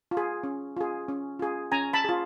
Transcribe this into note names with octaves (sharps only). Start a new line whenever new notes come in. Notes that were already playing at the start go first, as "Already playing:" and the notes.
F4
G#4
C#4
F4 G#4
C#4
F4 G#4
C#4 G#5 A#5
A5 B5
F4 G#4